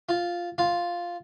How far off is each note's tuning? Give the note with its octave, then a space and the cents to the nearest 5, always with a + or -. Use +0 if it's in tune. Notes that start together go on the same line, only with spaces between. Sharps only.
F4 +0
F4 +0